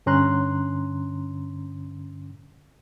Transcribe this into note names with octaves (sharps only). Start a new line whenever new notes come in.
G2 D3 C#4 A#5 C6 F#6